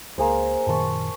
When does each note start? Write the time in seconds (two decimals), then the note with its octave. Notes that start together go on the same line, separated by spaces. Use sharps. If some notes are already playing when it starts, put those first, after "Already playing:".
0.18 C#2 A#3 G#4 C5
0.67 F#2 A#2 D#3 A5 C6 C#6